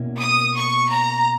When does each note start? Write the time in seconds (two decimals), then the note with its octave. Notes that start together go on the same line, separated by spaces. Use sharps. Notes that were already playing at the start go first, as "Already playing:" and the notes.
Already playing: B2 A#3 C#4 E4
0.19 D#6
0.55 C#6
0.91 A#5